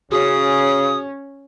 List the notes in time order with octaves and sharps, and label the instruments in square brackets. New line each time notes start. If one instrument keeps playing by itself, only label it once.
[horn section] C#3 [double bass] C#4 [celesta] F#4 G#4 [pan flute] D#6